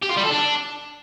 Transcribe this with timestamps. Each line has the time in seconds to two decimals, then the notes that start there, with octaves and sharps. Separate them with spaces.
0.02 G4
0.09 F4
0.16 G3
0.23 A4
0.31 D4